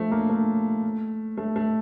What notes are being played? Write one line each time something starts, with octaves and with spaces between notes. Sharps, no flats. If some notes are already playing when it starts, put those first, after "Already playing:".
Already playing: F3 A3
A#3
A3
A3
A3